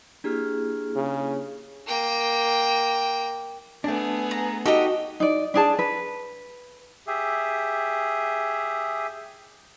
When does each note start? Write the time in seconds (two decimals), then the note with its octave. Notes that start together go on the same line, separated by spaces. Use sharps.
0.24 A#3 D4 E4 G4 G#4 F6
0.96 C#3
1.87 A#3 G5
3.84 A3 B3 D4 G#4
4.31 A#5
4.66 D#4 F#4 G4 A4 D#5
5.20 D#4 D5
5.54 D4 G#4 A5
5.79 B4
7.07 G4 G#4 E5